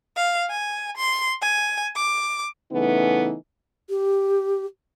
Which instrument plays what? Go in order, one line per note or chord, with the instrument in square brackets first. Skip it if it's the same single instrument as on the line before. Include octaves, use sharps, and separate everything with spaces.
[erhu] F5
G#5
C6
G#5
D6
[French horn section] C#3 E3 A3 B3 D#4
[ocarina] G4